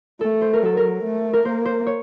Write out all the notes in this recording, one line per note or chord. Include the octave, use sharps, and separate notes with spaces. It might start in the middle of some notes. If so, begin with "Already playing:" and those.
A3 A4
C5
A#4
F#3 A4
A#4
A3
A#4
A#3 C5
C5
C#5